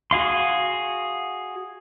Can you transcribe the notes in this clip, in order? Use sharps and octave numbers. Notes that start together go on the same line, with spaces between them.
F#4 G#4 F5 C6